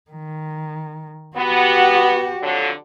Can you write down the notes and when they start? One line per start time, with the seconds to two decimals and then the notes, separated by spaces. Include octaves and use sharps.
0.11 D#3
1.37 B3 F#4 G4
2.42 F2 D3 F#3